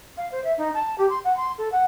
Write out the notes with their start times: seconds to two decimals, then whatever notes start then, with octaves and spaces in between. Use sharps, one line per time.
0.17 F5
0.31 C5
0.44 E5
0.57 D#4
0.74 A5
0.98 G4
1.09 C6
1.24 F#5
1.36 C6
1.58 A4
1.72 F#5